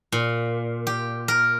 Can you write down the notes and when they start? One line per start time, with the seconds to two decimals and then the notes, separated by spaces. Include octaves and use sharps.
0.12 A#2
0.87 G4
1.28 A#4